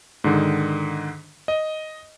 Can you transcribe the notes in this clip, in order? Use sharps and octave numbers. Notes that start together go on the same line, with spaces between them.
G#2 D3 D#3
D#5